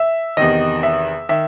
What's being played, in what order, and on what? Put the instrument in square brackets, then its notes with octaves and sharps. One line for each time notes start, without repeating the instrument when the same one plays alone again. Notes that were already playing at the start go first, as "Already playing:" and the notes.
Already playing: [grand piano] E5
E2 C3 D#3 D#5
E5
D#3 E5